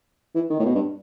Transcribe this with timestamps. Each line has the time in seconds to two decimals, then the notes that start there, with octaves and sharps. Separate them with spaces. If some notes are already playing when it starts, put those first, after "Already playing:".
0.35 E3
0.50 D#3
0.60 A2
0.66 B2
0.75 G2